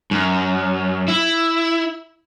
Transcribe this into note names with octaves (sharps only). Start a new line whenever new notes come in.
F#2
E4